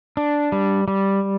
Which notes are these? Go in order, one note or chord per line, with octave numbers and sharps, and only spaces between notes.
D4
G3
G3